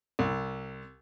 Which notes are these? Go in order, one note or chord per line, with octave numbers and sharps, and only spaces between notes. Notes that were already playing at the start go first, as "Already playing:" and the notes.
C2